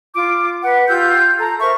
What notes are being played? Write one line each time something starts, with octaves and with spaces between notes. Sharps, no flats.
F4 D6
B4 F#5
F4 G4 E6 G6
A4 A#5
A#4 C5 E5 C#6